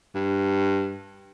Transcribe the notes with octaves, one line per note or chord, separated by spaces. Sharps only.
G2